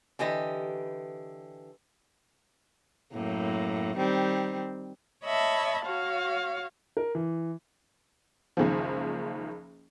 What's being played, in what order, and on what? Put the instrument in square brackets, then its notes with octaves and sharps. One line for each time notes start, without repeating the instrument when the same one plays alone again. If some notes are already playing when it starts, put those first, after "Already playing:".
[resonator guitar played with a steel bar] D3 E3 G4 B4 D#5
[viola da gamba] F#2 A2 A#3
D#3 G3 C4
[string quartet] C#5 D#5 E5 A5 B5
F#4 C#5 F5
[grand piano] A#4
E3
[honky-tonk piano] F#1 C#2 D#3 F3